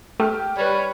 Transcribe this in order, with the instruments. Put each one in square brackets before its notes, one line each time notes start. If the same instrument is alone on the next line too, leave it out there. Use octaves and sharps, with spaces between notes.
[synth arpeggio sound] A3 [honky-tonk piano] G4 F6
[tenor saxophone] G3 [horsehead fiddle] B4 C#5